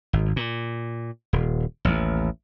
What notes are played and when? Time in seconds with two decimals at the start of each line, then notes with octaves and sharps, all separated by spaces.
0.13 G#1
0.36 A#2
1.33 D#1
1.85 A1 D#2